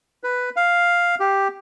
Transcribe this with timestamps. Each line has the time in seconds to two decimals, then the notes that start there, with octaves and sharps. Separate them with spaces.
0.24 B4
0.56 F5
1.20 G4